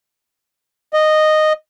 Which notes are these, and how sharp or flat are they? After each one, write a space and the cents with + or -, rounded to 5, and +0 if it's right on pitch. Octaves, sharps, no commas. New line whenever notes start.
D#5 -10